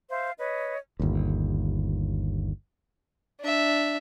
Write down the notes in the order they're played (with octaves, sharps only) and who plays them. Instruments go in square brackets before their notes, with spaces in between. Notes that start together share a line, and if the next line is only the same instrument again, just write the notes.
[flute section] C5 E5 F5
B4 C#5 D#5
[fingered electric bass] G1 D#2
[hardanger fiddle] D4 E5